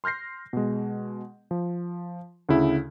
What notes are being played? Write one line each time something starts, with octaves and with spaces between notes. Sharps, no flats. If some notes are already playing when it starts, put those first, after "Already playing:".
C6 F6 G6 A#6 C7
B2 G#3
F3
D2 C#3 E4